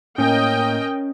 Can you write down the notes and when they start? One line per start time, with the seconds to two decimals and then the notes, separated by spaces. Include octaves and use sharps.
0.18 A2 A#3 C#4 A#4 D#5 G5